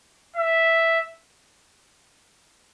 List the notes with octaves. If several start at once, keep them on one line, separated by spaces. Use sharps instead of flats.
E5